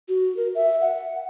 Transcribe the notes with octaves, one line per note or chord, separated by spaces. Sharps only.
F#4
A#4
E5
F#5